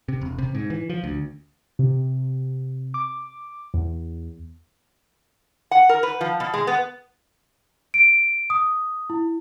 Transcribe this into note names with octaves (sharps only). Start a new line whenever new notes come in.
C3
E1
C3
G#2
E3
F3
D2
C3
D6
E2
F#5
A#4
B4
F3
B2
G#3
B3
D7
D#6
E4